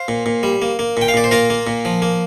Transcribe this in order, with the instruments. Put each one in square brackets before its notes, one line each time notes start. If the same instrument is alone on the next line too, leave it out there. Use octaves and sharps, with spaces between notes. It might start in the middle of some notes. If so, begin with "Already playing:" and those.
Already playing: [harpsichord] C5 F5
A#2
A#2
G3
A#3
A#3
A#2 G5
F5
A#2 D5
C5
A#3 F4 A#4
A#3
A#2
F3
A#3